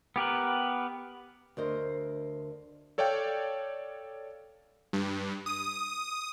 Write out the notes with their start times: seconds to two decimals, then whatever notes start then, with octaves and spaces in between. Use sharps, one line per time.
0.16 B3 G4 A#4 B4
1.57 D2 A#4 C5 D#5
2.98 A4 C#5 D5 F5 G5
4.93 G2
5.46 D#6